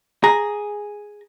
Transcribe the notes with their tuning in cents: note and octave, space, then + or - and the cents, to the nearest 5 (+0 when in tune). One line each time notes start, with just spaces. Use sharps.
G#4 +0 A#5 +0